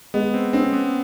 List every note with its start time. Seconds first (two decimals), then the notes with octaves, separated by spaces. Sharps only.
0.14 G#3 B3
0.34 C4
0.53 C4 C#4
0.73 B3